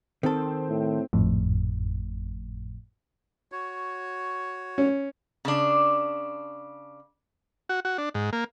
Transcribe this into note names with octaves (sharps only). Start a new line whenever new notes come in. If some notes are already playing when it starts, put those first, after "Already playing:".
D#3 C4 A4
A2
G#1 F2 A2
F#4 C#5
C#4
C#3 D4
F#4
F#4
D4
G#2
A#3